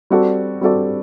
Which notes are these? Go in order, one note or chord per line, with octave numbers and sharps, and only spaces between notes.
G3 C4 F#4 A4 D5
G3 C4 F#4 A4 D5